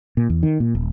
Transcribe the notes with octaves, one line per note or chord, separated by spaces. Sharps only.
A#2
E2
D#3
A#2
D#1